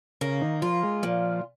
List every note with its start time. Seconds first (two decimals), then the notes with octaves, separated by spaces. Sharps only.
0.21 C#3 A#3
0.41 D#3
0.62 F3 F4
0.83 G#3
1.03 A#2 F3